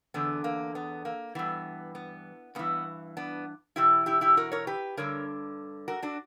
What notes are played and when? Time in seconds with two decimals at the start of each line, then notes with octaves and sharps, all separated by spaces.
0.14 E2 D3 B3
0.44 A#3
0.75 B3
1.05 A#3
1.35 G2 E3 B3
1.95 B3
2.55 G2 E3 B3
3.17 B3 D4
3.76 E2 B2 E4 G4
4.06 E4 G4
4.21 E4 G4
4.37 F#4 A#4
4.52 A#4 C#5
4.67 G4 B4
4.97 G2 D3 A#4 C#5
5.88 F#4 A#4
6.02 D4 F#4